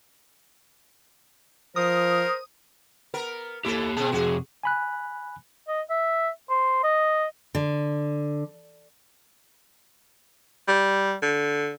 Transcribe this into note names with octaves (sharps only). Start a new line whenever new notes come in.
F3 A#4 C5 D#6
B3 A#4
A#3 E4 G4 A4
B2 B3 C4 G#4 A5
F2 C3 F#4 G#4
G#5 B5 F#6
D#5
E5
C5
D#5
D3
G3
D3